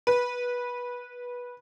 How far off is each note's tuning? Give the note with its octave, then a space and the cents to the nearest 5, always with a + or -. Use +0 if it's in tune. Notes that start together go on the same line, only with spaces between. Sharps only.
B4 -15